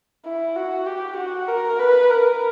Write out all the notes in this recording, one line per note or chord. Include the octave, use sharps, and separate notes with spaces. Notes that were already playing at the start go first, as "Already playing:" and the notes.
E4
F#4
G4
F#4
A#4
B4
A#4